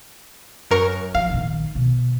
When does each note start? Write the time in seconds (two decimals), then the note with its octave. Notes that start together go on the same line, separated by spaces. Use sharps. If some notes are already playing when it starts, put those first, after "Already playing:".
0.71 F#2 A#4 C#6
1.15 F3 F5
1.30 A#1 D#3
1.75 B2